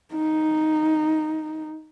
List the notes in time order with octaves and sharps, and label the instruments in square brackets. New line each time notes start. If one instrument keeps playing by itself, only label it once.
[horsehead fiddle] D#4